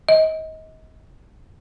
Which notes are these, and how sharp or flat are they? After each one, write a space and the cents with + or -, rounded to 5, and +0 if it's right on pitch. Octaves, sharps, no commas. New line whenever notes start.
D#5 +30